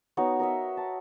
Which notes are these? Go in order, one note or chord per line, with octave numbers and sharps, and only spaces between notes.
B3 D#4 F#4 C#5
A#4 D#5 E5
A5